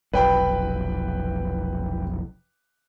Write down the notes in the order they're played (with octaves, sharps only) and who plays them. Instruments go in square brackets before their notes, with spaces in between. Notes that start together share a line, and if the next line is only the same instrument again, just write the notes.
[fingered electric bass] F1 B1 [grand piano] B4 G5 B5